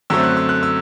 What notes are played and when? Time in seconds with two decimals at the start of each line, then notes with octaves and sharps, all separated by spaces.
0.10 F#2 D3 A3 C4 E6
0.24 F#6
0.37 E6
0.49 F#6
0.63 E6